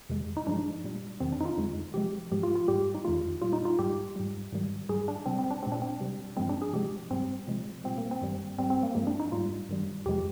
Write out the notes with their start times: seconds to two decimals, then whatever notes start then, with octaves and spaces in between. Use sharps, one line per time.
0.09 F2 C3 D#3 G#3
0.37 D#4
0.47 G2 F3 G#3 D4
0.84 A#2 G3
1.20 F2 C3 D#3 C4
1.33 D4
1.41 D#4
1.45 F4
1.58 F2 D3 G#3
1.94 C3 F3 G#3 G4
2.31 G#2 F3 G#3 G4
2.43 F4
2.56 F4
2.68 G#2 G3 G4
2.95 D#4
3.05 F2 D#3 G#3 F4
3.42 A#2 G3 F4
3.53 D#4
3.65 F4
3.79 G#2 G3 G4
4.16 G#2 G3
4.53 G#2 D#3 G3
4.89 G#2 G3 G#4
5.08 D4
5.26 C3 G3 C4
5.39 C4
5.51 D4
5.63 A#2 G#3 C4
5.72 D4
5.82 C4
6.01 C3 G3
6.37 G2 F3 G#3 C4
6.49 D4
6.62 G#4
6.73 C3 F3 G#3 G4
7.11 G#2 G3 C4
7.48 C3 F3 G#3
7.84 A#2 G3 C4
7.98 A#3
8.11 C4
8.22 G2 D#3 G3
8.58 G#2 G3 C4
8.70 C4
8.83 A#3
8.95 G2 F3 G#3 A#3
9.07 D4
9.20 D#4
9.32 G#2 G3 F4
9.69 G2 D#3 G3
10.06 F2 C3 F3 G#3 G4